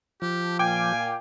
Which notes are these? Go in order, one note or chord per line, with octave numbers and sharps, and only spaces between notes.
F3 G4
A#2 F5 G5 G#5 D6